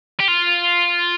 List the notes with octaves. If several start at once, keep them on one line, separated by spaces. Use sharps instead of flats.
G4
F4